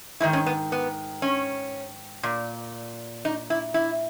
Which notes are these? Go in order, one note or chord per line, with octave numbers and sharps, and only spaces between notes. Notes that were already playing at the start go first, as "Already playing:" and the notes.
G#2 D#3 E4
C#4
B3
B3
C#4
A#2
D#4
E4
E4